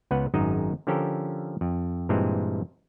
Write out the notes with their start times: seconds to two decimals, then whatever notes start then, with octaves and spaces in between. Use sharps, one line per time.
0.11 C#2 B3 B4 F#5
0.34 G#1 F#2 G#3 D#4 D#5
0.87 D3 F3 C#4 G4 A4 A#4
1.61 F2
2.09 G2 A#2 E3 G#3 C4